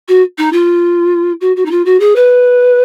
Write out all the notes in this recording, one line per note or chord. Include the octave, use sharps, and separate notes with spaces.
F#4
D#4
F4
F#4
F#4
D#4
F4
F#4
G#4
B4